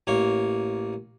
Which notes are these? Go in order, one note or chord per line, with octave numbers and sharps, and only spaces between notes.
A1 A#3 C#5